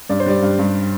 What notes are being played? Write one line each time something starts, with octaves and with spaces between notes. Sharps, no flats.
G2 D5
C5
G3 D5
G2
G2